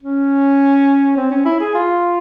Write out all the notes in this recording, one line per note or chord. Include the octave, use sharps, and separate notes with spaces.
C#4
C4
C#4
E4
G#4
F4